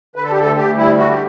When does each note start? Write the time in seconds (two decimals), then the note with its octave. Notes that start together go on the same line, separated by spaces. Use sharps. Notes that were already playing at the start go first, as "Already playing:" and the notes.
0.16 D3 B4
0.24 A4
0.32 G4
0.36 D2 A4
0.57 D2 G4
0.77 G3 E4
0.98 D3 F#4
1.11 G4